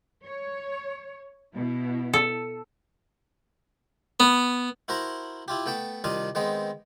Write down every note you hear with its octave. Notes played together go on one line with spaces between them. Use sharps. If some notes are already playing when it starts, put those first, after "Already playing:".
C#5
B2 E4
A4
B3
E4 F#4 A#4 C5 A#5 C6
E4 F4 G4
A3 B3 G5 A5
C2 D#3 D4 F4 F5 D#6
D#3 G#3 B3 C4 D#5